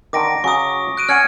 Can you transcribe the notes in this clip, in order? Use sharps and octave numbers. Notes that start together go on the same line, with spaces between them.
D3 D#3 D6 A#6 D7
C#3 F#3 C#6 D#6
F#6 D7 D#7
C#4 F#5 F6 G#6 C#7